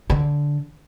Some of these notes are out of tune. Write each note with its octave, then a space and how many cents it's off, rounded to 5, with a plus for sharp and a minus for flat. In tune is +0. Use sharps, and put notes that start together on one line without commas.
D3 -10